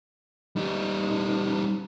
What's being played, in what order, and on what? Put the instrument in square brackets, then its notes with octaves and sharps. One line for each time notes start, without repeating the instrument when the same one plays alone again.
[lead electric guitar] G3 D#4